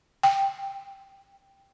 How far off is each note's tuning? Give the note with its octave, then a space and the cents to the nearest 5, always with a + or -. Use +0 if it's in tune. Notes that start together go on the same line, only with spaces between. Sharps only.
G5 +5